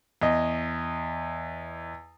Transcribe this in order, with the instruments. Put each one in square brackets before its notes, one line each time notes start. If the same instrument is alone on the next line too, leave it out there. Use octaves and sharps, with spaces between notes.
[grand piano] E2 D#5